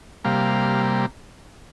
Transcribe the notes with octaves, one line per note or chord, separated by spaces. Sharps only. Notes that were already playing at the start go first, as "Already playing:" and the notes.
C3 G3 A#3 F5